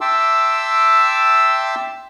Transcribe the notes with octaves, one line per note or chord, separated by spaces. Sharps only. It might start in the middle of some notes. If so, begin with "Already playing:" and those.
E5 G5 A5 C6 D6 E6